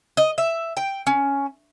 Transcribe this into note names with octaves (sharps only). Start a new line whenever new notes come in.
D#5
E5
G5
C#4